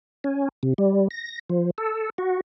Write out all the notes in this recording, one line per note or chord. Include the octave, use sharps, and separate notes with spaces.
C#4
C3
G3
A#6
F3
A4
F#4